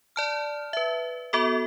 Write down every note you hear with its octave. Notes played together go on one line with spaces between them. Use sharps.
D5 A5 F6
B4 E5
B3 F#4 A4 D6